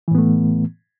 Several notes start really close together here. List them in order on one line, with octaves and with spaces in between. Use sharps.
E3 A2 B3 A3